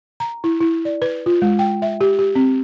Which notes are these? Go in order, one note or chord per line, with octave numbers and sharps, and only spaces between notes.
A#5
E4
E4
D5
B4
F4
G#3
G5
E5
G4
G4
C4